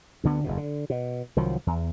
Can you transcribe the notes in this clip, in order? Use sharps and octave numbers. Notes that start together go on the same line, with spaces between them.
D2 D3 B3
F#1 E2 B2
D3
B2
C2 D#3 F3 F#3
E2